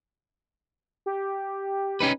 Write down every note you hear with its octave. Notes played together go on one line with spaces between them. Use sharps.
G4
C#4 D#4 B4